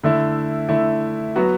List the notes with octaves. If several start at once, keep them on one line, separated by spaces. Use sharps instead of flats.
D3 A3 E4
D3 A3 E4
F#3 B3 F#4